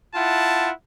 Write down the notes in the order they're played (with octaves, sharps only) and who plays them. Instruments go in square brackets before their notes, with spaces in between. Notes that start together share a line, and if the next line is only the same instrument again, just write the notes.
[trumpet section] E4 F4 F#5 [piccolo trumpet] A5